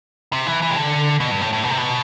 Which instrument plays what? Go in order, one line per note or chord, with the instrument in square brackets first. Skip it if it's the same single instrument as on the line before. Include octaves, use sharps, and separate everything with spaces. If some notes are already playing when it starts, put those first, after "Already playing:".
[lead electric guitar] C3
E3
E3
C3
D3
B2
G2
A2
A2
B2
C3
B2